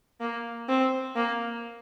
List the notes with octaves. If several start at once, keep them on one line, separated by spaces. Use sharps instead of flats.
A#3
C4
A#3